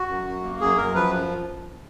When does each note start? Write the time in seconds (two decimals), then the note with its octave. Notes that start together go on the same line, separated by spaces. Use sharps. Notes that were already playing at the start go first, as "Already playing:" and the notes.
Already playing: F#4
0.09 F#2
0.26 F#2
0.43 A#3
0.61 F#2 G#4
0.78 F#2 A#4
0.95 F3 B4